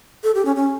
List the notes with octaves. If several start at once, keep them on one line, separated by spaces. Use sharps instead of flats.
A4
G4
C#4
C#4